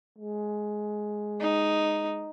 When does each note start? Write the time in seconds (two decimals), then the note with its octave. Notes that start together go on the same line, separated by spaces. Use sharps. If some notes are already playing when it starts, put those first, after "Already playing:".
0.18 G#3
1.40 D#4